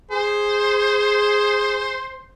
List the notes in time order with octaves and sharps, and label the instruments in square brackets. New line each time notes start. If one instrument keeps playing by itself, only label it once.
[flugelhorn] G#4 [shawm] C5